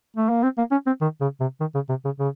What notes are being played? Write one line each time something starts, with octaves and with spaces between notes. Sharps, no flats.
A3
A#3
C4
A#3
C#4
C4
D#3
C#3
C3
D#3
C#3
C3
C#3
C#3